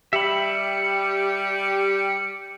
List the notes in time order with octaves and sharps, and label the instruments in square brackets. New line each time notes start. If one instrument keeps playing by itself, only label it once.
[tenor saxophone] G3 [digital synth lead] G4 [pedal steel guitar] E5 B5 [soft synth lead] C#7